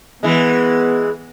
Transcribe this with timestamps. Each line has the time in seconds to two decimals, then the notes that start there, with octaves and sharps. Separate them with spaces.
0.23 E3 G#3 B3